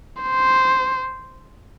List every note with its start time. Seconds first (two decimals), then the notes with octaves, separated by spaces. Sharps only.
0.22 C5